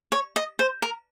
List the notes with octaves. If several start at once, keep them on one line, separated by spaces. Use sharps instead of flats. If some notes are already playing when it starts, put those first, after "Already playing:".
C#5
D#5
C5
A#4